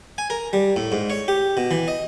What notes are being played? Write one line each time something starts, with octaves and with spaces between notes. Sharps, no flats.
G#5
A#4
G3
A2
G#2
C#5
G4
B2
E3
D#5